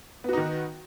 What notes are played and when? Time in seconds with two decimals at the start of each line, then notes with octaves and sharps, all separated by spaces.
0.24 B3
0.29 F#4
0.33 D#4
0.38 D#3